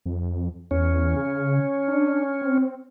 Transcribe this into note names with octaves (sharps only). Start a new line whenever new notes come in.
F2
E2 C#4
C#3
D4
C4